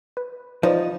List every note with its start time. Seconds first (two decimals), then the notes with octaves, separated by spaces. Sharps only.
0.17 B4
0.63 F3 D#4 B4 C5 D5